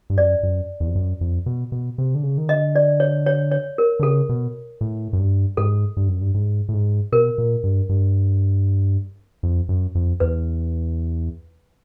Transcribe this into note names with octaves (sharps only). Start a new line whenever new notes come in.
G2
F#2 D5
F#2
E2
F2
F#2
F2
B2
B2
C3
D3
C#3
D#3
D3 D#5
D5
C#5
C#5
C#5
A#4
D3
C#3 A4
B2
A2
F#2
G2
G#2 A4
G2
F#2
G2
G#2
A2
G#2
B2 A#4
A#2
G2
G2
F2
F#2
F2
E2 B4